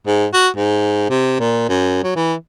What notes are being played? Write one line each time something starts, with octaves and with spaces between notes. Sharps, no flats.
G#2
F#4
G#2
C3
A#2
F#2
F#3
E3